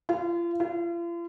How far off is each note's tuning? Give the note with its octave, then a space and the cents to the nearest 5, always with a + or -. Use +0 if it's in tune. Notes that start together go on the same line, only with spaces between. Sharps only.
F4 -35
F4 -40